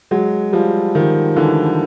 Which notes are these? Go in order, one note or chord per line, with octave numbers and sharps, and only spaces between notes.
F#3 G#3
F3 G3
D#3 F3
D3 E3